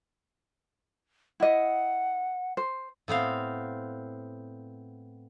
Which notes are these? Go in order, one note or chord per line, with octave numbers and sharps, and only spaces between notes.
E4 D#5 F#5
C5
A2 B3 C4 F5